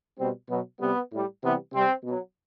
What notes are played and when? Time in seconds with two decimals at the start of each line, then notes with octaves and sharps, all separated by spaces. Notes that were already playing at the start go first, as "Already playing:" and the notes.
0.18 B2 G3 C4
0.49 B2 F#3 B3
0.80 C3 G3 B3
1.11 A2 G3
1.42 C3 E3 G3 B3
1.73 C3 G3 C4
2.03 B2
2.08 F#3